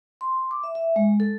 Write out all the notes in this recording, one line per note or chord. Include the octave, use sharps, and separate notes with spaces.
C6
D6
E5
E5
G#3
A4